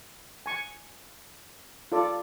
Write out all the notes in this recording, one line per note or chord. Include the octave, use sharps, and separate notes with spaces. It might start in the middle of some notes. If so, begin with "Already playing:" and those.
G#5 C#6
F4 A4 D5